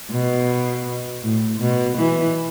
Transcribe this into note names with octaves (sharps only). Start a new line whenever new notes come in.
B2
A2
B2
E3